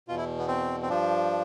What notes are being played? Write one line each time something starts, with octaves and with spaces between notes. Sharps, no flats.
E2 B2 F4
E4
B3
C4
C4
G2 F3 D4